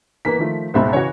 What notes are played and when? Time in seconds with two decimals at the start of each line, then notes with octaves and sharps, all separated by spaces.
0.25 E3 A#3 B3 B6
0.38 D#3 F3 A3
0.74 C#2 G#2 B2 C5 E5 B5
0.93 C#3 E3 F#4 C#5